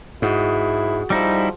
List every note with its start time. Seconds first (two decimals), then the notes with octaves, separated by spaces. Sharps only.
0.22 G#2 E4 F#4 G#4 F#5
1.10 F3 G3 D#4 E4